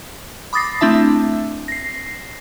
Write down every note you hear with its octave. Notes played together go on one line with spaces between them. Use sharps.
B5 D6 D#6 A6 A#6 C7
A3 C4 D4 E4 E5 A5
A#6 C7